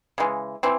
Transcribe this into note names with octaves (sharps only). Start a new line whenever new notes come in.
C#3 E3 G#3
E3 C4